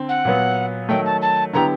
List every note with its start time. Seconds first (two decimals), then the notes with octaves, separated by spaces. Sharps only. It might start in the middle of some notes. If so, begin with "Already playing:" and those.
Already playing: D3 C4
0.09 F#5
0.25 A#2 F#3 B3
0.89 D#3 F#3 A3 G5
1.06 A5
1.22 A5
1.53 D3 F#3 B3 E4 G4 A#5